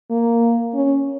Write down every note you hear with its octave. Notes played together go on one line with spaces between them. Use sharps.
A#3
C#4